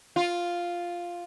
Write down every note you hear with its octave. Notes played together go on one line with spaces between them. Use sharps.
F4